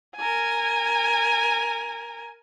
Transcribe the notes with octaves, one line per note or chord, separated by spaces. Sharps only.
A#4 G#5